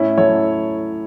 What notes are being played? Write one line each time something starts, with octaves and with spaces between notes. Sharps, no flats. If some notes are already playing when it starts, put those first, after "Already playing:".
Already playing: A2 C#4 E4
F#3 A4 C#5